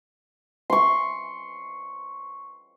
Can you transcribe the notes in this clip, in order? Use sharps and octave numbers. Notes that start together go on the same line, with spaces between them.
C6 C#6